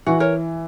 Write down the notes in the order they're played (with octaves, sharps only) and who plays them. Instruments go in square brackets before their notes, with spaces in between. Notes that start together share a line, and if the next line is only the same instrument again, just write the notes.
[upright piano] E3 [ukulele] F#4
[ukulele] A#4 C#5